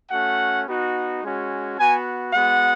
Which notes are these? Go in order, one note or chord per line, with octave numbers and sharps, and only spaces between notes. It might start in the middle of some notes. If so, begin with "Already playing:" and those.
A3 C#4 F#4 F#5
B3 D#4 F#4
G#3 C#4 F#4
B3 F#4 G#5
G#3 B3 F#4 F#5